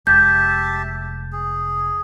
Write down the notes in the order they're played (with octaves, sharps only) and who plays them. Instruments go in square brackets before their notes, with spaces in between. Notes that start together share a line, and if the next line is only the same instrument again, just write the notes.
[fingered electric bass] F1 G#3 [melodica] G4 E5 A5 [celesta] G6
[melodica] G#4